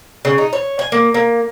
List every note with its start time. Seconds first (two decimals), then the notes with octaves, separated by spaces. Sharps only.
0.25 C#3
0.38 D#4
0.53 C#5
0.79 G#5
0.92 A#3
1.14 A#3